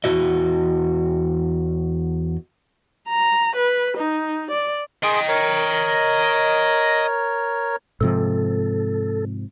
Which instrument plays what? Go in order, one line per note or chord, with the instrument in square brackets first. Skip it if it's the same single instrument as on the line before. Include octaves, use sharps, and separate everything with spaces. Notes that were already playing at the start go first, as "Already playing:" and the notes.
[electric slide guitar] E2 G2 E4 F#4 D#5
[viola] A#5
B4
D#4
D5
[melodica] G#4 C6 D#6 [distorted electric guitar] D#5 G5
[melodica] A#4 C#5
[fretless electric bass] G#2 C3 F3 [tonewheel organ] A4